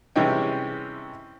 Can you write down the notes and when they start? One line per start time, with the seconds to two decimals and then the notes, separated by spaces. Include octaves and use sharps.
0.16 C3 E3 G3 G#3 C#4 G5